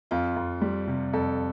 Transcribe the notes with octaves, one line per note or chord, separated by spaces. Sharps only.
F2 F4
F2
G3
C3
F2 A4